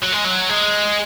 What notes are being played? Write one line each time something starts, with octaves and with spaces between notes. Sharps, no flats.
F#3
G#3
F#3
G#3